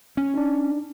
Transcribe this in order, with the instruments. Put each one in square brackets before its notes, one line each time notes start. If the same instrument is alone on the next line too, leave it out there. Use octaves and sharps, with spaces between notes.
[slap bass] C#4
[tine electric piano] D4 D#4